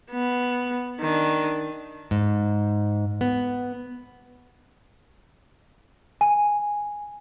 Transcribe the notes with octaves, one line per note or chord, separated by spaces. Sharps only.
B3
D#3 D4
G#2
B3
G#5